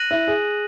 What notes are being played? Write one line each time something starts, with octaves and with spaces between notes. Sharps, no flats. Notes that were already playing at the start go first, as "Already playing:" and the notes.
Already playing: F#6 A#6 D#7 F#7
E4
G#4